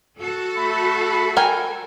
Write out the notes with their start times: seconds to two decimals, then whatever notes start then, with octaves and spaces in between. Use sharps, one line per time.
0.20 F#4 A4
0.56 A3 B5
1.37 A#4 G5 G#5